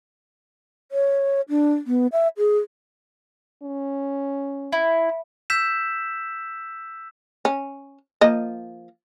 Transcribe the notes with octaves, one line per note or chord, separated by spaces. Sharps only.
C#5
D4
B3
E5
G#4
C#4
E4
E6 G6 B6 E7
C#4
F3 A#3 D#5